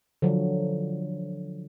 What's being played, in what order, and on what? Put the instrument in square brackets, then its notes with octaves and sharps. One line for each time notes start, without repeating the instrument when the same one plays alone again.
[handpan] D3 F3 F#3